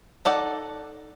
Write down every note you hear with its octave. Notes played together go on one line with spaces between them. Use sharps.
D#4 A4 D5 F#5